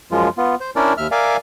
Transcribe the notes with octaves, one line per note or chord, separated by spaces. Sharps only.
F#2 F3 G#3 F4
B3 F4
C5
C#4 D4 E4 A#4 D5
D#2 E5 F6
A#4 D5 E5 F5 G#5